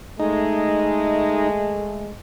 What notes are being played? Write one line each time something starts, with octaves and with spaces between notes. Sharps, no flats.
G#3 A3 D#4